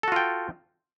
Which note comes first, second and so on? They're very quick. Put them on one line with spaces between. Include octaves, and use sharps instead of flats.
A4 F#4 F4 G5